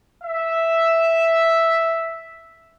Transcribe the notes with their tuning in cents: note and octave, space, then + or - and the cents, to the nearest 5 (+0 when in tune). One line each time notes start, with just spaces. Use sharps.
E5 +0